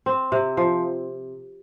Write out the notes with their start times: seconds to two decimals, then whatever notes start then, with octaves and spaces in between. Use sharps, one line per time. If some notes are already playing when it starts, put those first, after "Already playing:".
0.06 C4
0.32 C3
0.57 F3